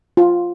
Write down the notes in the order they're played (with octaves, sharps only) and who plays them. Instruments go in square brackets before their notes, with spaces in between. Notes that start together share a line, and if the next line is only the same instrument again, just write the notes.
[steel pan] F4